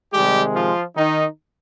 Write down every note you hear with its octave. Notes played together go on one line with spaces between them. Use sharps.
C3 D#3 G3 G#3 G4
F3 F4
D#3 D#4